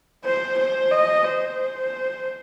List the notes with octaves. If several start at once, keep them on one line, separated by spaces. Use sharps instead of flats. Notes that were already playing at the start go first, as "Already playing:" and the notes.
C5
C5
D#5
C5